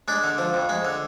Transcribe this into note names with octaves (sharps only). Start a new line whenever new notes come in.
G#3 D4
D3
F3
F2
G#3
D3